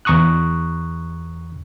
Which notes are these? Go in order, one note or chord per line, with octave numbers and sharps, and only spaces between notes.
E2 A#5 C#6 D#6 F#6